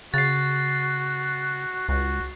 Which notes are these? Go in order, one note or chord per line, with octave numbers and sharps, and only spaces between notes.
C#3 F#4 A6 C7
C#2 F#4